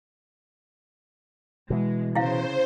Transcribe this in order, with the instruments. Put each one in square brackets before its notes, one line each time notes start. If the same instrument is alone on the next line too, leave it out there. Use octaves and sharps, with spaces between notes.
[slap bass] B2 E3 [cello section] G#3
[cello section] C#3 [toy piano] E4 F5 [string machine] C5